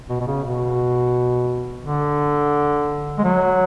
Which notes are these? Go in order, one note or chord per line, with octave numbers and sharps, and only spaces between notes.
B2
B2
C#3
B2
D3
G#3
F#3